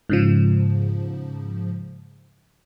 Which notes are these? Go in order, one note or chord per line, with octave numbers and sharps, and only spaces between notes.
G#2 C#3 F3